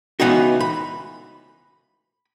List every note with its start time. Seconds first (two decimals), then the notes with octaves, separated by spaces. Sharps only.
0.20 C#2 E3 B3 D#4 F#4
0.60 B5